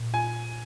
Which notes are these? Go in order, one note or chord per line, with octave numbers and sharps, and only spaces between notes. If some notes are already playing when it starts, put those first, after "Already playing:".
Already playing: A#2
F4 G#5